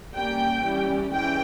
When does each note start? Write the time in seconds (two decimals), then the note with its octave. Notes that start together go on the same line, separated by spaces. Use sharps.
0.14 G3 A#3 C#4 G5
0.62 E3 G3 C#4
1.11 E3 G#3 C#4 G5